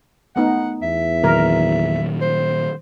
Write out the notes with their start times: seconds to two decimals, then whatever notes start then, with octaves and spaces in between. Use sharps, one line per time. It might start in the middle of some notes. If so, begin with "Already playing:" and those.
0.36 A3 B3 D#4 F#5
0.83 E2 E5
1.24 A#2 D#3 F#3 A#4
2.21 C5